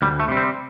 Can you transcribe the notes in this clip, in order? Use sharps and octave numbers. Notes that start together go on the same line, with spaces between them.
D2 G3
A3
C3 G3
C4